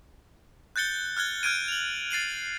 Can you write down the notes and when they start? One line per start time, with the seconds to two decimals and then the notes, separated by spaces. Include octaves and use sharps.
0.76 F#6 G6 A6 C#7 G7
1.17 F6 F#6 G#6 G7
1.43 F6 G6 G#6 D7 D#7
1.68 F7 F#7
2.11 A6 C7 D#7 F#7